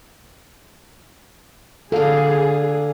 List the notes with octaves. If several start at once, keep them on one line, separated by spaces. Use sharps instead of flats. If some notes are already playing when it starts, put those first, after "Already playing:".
D3 A#3 G#4 A4 F5